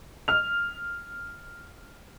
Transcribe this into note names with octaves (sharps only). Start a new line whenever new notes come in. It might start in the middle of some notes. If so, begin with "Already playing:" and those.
F6 F7